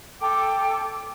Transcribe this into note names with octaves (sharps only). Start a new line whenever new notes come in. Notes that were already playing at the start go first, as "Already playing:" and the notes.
A4 G5 D6